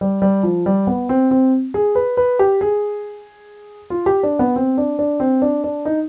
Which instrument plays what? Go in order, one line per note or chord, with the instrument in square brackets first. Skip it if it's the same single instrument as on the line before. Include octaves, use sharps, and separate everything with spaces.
[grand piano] G3
G3
F3
G3
B3
C4
C4
G#4
B4
B4
G4
G#4
F4
G4
D4
B3
C4
D4
D4
C4
D4
D4
D#4